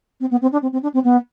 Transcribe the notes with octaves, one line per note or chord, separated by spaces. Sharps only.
C4
B3
C4
D4
C4
C4
D4
C4
B3